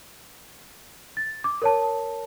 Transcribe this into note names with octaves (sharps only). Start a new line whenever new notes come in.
A6
D6
A#4 C#5 A5